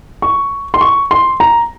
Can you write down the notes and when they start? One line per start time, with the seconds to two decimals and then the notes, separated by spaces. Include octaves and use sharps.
0.22 C#6
0.74 C6
0.81 C#6
1.11 C6
1.40 A#5